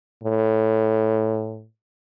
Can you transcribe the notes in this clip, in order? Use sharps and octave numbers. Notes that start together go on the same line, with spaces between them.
A2